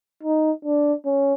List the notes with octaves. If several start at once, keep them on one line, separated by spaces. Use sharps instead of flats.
D#4
D4
C#4